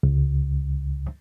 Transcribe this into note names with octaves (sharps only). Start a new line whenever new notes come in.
C#2